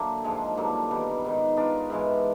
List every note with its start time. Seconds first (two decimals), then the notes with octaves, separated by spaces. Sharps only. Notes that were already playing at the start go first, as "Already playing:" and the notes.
Already playing: D3 F#3 A#3 E4
0.24 G#2 F3 G#3
0.57 G2 D3 F#3 A#3
0.91 D#3 G3 B3
1.24 G#2 D#3 G3
1.57 B3 D4 F4 A#4
1.90 G#2 E3 G#3